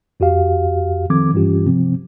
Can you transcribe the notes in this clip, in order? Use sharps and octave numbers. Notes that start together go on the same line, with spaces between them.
F2 F#4 G4 F5
D#3 F3 C4 A4 D6 G#6
G2 E3 G3 C#4 F4 G4
C3 F3 C4